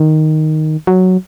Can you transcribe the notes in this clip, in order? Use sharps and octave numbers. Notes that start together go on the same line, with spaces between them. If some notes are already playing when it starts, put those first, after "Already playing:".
Already playing: D#3
F#3